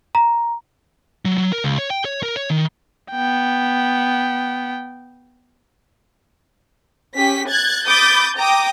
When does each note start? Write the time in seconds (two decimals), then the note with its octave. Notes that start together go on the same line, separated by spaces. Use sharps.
0.15 A#5
1.25 F#3
1.38 F#3
1.53 A#4
1.64 C#2
1.78 C#5
1.90 G5
2.05 C#5
2.23 A#4
2.36 C#5
2.50 D#3
3.11 B3 G5
7.15 C#4 G4 B6
7.48 F#6 G#6 A6
7.86 B5 D6 D#6 G6 A6
8.37 G5 A#5 D6 D#6